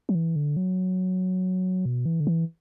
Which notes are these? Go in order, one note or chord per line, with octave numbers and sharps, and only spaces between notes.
F#3
E3
D3
F#3
B2
E3
D3
E3